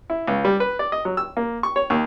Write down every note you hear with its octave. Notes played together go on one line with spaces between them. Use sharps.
E4
C#2
G3
B4
D5
D#5
F#3
E6
A#3
C#6
C#5
D#2